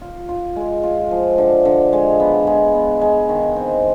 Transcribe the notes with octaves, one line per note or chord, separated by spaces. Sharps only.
F4
F4
G#3
F4
F3
D3
D3
G#3
B3
G#3
B3
G#3
D#3
C4